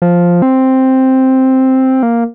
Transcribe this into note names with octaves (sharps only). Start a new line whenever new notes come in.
F3
C4
A#3